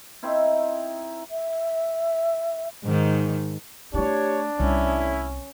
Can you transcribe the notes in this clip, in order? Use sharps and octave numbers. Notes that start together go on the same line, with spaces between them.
C4 D#4 E4
E5
G#2 D#3
A3 D4 E4 G4 C#5
C2 A2 C#4 E4